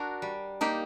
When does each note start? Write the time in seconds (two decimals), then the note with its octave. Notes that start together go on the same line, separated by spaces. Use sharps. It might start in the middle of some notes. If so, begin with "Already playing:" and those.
Already playing: D4 F#4 A#4
0.22 G3
0.61 A#3 D#4 G4